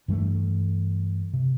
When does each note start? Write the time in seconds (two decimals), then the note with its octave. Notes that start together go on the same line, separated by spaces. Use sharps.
0.08 G2 E3 G3 A3
1.33 C3